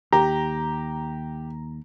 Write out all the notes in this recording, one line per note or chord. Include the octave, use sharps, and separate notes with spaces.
D#2 G4 A#5